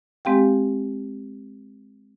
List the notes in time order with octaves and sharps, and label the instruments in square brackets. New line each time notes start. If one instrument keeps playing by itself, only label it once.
[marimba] G#3 C4 G4 F5 G5